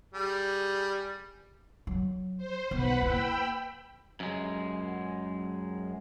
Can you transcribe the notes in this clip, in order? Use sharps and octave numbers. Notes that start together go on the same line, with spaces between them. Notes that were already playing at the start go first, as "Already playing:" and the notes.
G3 G#4
F#3
C5
B1 B4 F#5 B5
A#3 E4 G5 B5 E6
F#2 G#3